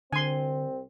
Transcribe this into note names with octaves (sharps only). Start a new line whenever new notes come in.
C2 D3 C4 G#5 C6